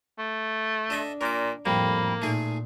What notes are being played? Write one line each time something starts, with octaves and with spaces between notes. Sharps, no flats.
A3
D4 A4 D#5 E5
A#2 A#4 D6
F2 A2 G3 A#3 B5
A#2 A3 D#4 G#4